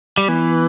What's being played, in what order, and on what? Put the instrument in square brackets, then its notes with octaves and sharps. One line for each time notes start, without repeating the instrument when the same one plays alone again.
[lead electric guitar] G3
[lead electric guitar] E3 [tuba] B3